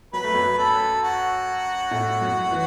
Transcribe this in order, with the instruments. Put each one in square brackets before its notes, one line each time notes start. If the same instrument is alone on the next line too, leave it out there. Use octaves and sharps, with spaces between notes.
[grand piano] F#3 [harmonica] B4
[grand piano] A3
F#2 F#3
[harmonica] A4
F#4
[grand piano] A2 A3
F#2 F#3
E3